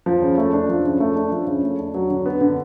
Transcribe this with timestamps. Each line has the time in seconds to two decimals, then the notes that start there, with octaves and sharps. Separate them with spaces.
0.06 F3
0.22 C#3
0.38 A3
0.53 D4
0.69 F3
0.84 C#3
1.00 A3
1.16 D4
1.32 F3
1.47 C#3
1.63 A3
1.79 D4
1.94 F#3
2.10 D3
2.26 B3
2.41 D3